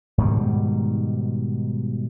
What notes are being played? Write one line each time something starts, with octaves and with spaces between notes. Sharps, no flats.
G#2 B2 D#3 G3